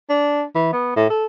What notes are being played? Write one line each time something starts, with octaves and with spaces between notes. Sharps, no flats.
D4
E3
B3
A2
A4